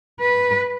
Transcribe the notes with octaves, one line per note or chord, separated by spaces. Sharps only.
B4